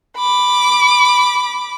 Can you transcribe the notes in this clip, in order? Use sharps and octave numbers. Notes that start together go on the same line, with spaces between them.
B5 D6